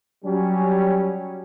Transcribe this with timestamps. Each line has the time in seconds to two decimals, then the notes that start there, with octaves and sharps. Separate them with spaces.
0.25 F#3 G3 C#4